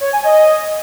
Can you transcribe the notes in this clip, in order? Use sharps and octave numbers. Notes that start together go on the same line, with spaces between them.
C#5
G#5
D#5